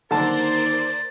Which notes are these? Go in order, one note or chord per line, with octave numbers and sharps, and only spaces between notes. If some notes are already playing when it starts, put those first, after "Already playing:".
D#2 D3 A#4 C5 D5 A5 A6